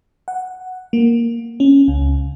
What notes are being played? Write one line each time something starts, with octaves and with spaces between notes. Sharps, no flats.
F#5
A#3
C#4
C#2